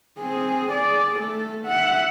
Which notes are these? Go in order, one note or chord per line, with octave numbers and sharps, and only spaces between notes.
C4 G#4
G#4 D5
A3 A4
E5 F#5